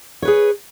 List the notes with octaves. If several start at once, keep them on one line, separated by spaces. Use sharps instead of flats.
G#4 B4 C#5